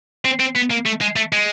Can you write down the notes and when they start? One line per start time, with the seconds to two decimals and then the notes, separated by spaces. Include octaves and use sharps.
0.25 C4
0.40 C4
0.56 B3
0.71 A#3
0.86 A3
1.01 G#3
1.16 A3
1.32 G#3